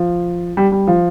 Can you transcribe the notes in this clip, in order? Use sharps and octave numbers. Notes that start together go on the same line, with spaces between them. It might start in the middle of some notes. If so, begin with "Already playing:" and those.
Already playing: F3
G3
G3
F3